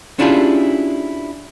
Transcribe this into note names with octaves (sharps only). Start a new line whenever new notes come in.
C#4 D4 E4 F4 G4 G#4